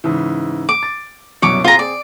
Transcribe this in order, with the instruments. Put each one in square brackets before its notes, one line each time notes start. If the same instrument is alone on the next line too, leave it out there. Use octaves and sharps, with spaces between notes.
[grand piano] G#2 C#3 E3
[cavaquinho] D6
[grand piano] A6
[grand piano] C2 F#2 B2 [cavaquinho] C#5 D6
[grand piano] C4 G#4 [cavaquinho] F4 A#5
[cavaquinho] D5